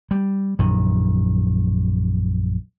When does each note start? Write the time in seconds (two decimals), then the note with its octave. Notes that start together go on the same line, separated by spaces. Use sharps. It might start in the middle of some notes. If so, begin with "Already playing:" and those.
0.11 G3
0.59 A#1 F#2 D#3